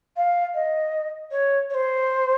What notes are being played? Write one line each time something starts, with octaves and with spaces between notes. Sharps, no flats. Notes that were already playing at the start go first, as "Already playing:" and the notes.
F5
D#5
C#5
C#5
C5